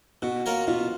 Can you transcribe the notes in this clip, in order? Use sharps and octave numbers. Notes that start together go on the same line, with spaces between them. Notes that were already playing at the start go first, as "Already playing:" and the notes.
B2 F#4
A#3 F4 A#4 C#5
B2 F4